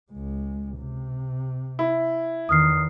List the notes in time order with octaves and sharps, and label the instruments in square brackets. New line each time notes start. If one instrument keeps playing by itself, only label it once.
[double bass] C#2 G#3
C3
[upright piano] E4
[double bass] E2 D#3 [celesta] D#6 F6 C7